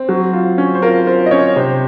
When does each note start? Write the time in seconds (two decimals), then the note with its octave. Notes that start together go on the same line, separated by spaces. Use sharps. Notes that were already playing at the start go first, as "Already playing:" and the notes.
Already playing: C4
0.09 F#3
0.33 F4
0.58 C#4
0.75 C5
0.82 F4 A#4
1.07 F4 C5
1.26 D#5
1.31 C#4 C#5
1.56 C3 C5